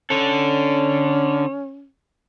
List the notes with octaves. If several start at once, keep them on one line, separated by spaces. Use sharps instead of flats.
D3 C#4 A4